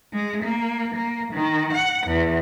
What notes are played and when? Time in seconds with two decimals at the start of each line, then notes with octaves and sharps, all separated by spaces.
0.13 G#3
0.43 A#3
0.95 A#3
1.33 D#3
1.73 F#5
2.07 E2